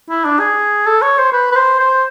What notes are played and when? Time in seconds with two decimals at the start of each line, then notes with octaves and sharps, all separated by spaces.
0.09 E4
0.25 D4
0.39 G#4
0.86 A4
1.02 C#5
1.18 C5
1.32 B4
1.52 B4
1.55 C5
1.79 C5